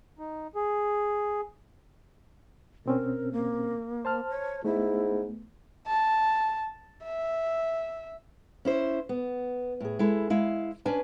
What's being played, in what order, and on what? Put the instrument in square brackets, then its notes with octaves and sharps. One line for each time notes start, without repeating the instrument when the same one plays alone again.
[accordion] D#4
G#4
[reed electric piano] B2 C4 C#4 [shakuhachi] A#4
[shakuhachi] A#3
[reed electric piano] C5 A5 F6
[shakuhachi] C#5
[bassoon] G#2 [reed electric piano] A3 B3 [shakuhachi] E4
[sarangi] A5
E5
[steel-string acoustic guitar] C#4 E4 C5
B3
A2 G#4
G#3 E4 A4
G#3 E4 F5
C#4 D4 B4 G#5